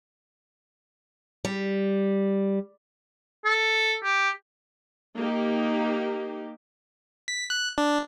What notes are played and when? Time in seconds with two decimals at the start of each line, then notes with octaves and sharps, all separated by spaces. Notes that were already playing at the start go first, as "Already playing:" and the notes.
1.45 G3
3.45 A4
4.04 G4
5.16 A#3 D#4 G4
7.28 B6
7.50 F#6
7.78 D4